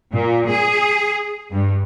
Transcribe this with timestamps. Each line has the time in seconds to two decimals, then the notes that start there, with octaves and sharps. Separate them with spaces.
0.13 A#2
0.49 G#4
1.51 G2